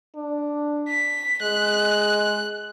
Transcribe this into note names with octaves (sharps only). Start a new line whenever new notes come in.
D4
B6
G#3 F#6